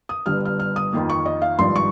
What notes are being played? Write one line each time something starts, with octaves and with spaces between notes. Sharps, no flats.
D#6
G1 G2 G3 F6
F6
F6
D#6
F2 D#3 A#3
C#6
D#5
F5
G#1 G2 F3 C6
C#6